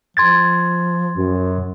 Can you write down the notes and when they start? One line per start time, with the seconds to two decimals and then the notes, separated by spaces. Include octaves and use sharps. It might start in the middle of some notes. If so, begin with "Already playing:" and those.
0.17 F3 C6 G#6 A6
1.16 F#2